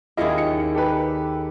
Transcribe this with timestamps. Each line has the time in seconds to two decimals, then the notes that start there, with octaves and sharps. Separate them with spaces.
0.17 D#2 C#4 E4 F4 G#4 D#5
0.38 C#7
0.75 G4 A4 B4